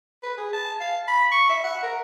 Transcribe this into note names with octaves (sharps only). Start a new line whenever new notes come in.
B4
G#4
A5
F5
B5
C#6
E5
F#5
A#4